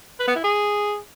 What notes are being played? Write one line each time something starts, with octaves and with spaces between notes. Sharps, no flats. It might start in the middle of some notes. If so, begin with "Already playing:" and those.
B4
B3
E4
G#4